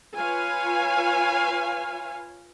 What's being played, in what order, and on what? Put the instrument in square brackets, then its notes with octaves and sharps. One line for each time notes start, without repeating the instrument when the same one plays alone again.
[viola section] F4 B4 C#5 F5 G#5